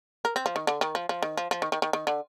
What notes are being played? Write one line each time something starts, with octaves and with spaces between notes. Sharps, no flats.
A#4
C4
F3
D#3
D3
D#3
F3
F3
D#3
F3
F3
D#3
D#3
D#3
D#3
D3